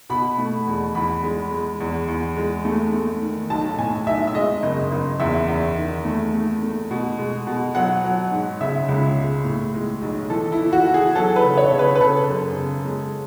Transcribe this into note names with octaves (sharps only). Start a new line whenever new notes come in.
B2 B5
A3
E2
E2 B5
G#3
G#3
E2
E2
G#3
A3
A3
D#3
B1 A5
A2 G#5
B1 E5
E5
G#3 D#5
F#1
F#1
E2 E5
E2
D#3
A3
A3
A3
B2
G#3
B2
F#3 F#5
F#3
G#2
C#3 E5
C#2
G#3
A2
G#3
B1
E3 A4
E4
E3
F#4
E3
G#4
F#3 A4
B4
C#3
C#5
C#3
B4
B4
C#3 A4
F#2
C#3
G#3